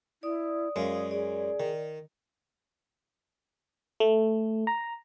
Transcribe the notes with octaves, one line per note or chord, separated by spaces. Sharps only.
E4 D5 D#6
F#2 G#3 F5
G#4 D5
D#3
A3
A#5